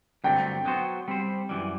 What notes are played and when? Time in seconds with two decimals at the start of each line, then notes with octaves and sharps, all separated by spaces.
0.24 G2 D3 F#3 A3 C4 G5
0.65 F#3 B3 F#4 C5
1.08 G3 C4 G4 C5
1.49 F#2 E3 G3